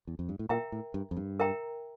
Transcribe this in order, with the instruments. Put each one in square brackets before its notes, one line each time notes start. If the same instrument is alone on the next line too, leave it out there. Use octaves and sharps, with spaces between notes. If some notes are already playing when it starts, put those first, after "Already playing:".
[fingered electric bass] E2
F2
G2
A2
[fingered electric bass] A#2 [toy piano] A#4 E5 G5 A#5
[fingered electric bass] A2
G2
F2
G2
[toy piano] A#4 E5 G5 A#5